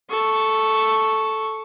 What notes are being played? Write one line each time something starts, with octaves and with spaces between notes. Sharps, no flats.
A4 C#6